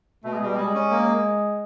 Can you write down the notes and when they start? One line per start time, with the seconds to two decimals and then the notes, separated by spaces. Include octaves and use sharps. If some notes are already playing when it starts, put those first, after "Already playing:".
0.24 B2 A3
0.35 G#3
0.41 B2 G3
0.56 G3 G#3
0.75 C#4
0.91 A#3